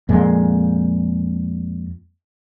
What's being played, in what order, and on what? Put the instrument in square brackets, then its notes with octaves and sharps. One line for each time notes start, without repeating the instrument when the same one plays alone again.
[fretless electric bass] F2 A#2 G#3